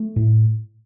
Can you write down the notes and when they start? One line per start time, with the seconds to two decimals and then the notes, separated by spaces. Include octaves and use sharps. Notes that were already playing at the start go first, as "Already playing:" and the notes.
Already playing: A3
0.16 A2